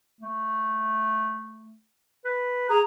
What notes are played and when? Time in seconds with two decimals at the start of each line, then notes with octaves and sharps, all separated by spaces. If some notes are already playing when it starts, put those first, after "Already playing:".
0.20 A3
2.25 B4
2.70 G#4 A#5